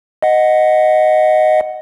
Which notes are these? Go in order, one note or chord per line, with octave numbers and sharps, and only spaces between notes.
D#5 F#5